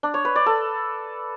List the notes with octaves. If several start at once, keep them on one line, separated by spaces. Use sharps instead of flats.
D4
C#5
B4
D5
A4